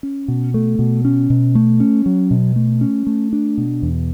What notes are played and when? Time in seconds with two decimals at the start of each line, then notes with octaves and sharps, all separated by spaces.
0.03 C#4
0.28 B2
0.54 A3
0.79 B2
1.05 C#4
1.30 B2
1.55 A3
1.80 C#4
2.06 F#3
2.31 B2
2.56 A3
2.81 C#4
3.07 A3
3.33 D4
3.58 B2
3.82 E2